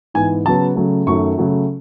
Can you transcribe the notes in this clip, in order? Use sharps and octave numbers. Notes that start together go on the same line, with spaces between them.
G#2 E3 B3 G#5
C#3 F#3 B3 A5
C#3 F#3 A3
F#2 D#3 F#3 A3 C#6
C#3 F#3 A3